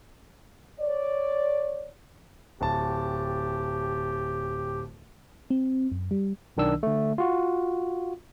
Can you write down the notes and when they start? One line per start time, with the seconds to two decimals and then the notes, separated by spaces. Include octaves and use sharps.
0.80 C#5 D5
2.61 D1 G4 A5
5.50 C4
5.92 F#2
6.11 G3
6.57 B1 D#3 D4 E6
6.83 D3 A3
7.18 F4 F#4